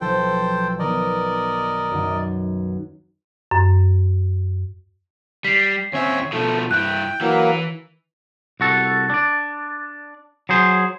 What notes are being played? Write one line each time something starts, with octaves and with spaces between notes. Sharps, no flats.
B1 F3 A4 C5 G5
D#3 B3 A#4 D5 D#5
F#2 D#3 F#5
F#2
G3 B6 C7
D#2 C4 C#4 C#5 E5
B2 F3 A3
G2 E4 G5 F#6
E3 F#3 A#3
C2 F#4 A4
D4 D5
F#3 G#4 C5